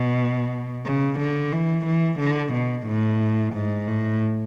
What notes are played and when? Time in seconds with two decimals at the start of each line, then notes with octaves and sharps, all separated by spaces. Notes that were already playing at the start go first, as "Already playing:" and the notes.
Already playing: B2
0.86 C#3
1.19 D3
1.53 E3
1.86 E3
2.20 D3
2.53 B2
2.87 A2
3.54 G#2
3.87 A2